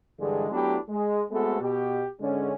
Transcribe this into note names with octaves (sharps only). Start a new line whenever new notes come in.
G2 D3 E3 G#3
F#3 A3 B3 D4 E4 G4
G#3
G#3 A3 B3 C4 F#4 A4
B2 G4
G#2 D3 G#3 C#4